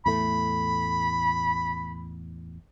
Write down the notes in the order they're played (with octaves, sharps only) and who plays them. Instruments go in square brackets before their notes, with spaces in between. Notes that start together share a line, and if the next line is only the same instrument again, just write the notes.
[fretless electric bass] E2 A2 A3 [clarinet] B5